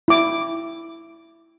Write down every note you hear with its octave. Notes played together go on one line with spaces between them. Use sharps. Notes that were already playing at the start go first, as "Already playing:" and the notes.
E4 D6